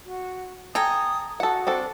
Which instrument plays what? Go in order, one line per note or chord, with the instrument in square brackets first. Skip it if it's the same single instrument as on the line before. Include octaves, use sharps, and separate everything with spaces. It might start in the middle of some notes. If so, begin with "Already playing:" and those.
[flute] F#4
[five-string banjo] A4 [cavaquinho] G5 G#5 A#5 [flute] D#6
[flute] F#4 [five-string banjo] A4 F#5
[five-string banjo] C4 D4 A4